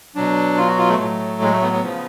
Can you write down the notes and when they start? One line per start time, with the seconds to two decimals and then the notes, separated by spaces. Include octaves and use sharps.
0.15 B2 F#3 D4
0.57 F4
0.68 F#4
0.78 F4
0.89 A3
0.99 A2 F#3
1.42 G#3
1.52 A3
1.62 B3
1.73 B3
1.84 C#3 F3